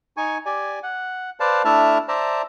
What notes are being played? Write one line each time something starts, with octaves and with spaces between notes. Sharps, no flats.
D#4 G#5 C#6
G4 D5 G#5
F#5
B4 C5 D5 F5 A5
A3 D4 E4 E5 A5 F6
C5 D5 E5 A5 A#5